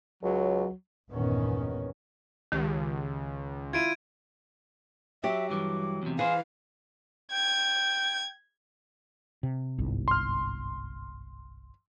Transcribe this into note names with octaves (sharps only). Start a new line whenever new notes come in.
C#2 F#3
G1 E2 A#2 D#3 B3 C#4
C#2 D#3 G4
E4 F4 G#6 D7 D#7
F#3 G4 E5
G2 E3 D6
E2 C3
E3 G#4 C5 F5
G5 G#6
C3
G1 C2 G#2
C6 F6